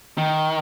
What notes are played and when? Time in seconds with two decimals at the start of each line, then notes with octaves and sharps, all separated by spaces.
0.18 D#3